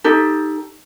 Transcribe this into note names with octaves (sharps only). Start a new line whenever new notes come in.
D#4 G4 A4